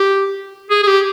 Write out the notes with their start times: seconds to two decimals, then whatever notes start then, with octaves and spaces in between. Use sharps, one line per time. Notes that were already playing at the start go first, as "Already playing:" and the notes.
Already playing: G4
0.70 G#4
0.83 G#4
0.87 G4